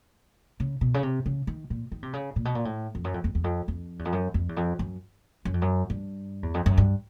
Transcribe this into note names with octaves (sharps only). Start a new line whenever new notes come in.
C#3
B2
C#3
C3
C#3
D#3
A#2
D#3
C3
C#3
A#2
B2
A#2
A2
F2
F#2
F2
F2
E2
F2
F2
E2
F2
F#2
F2
E2
F2
F#2
F#2
F2
F#2
G2
E2
F2
F#2
G2